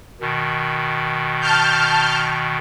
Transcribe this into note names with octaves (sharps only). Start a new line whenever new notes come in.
B2 D#3
A5 F6 G6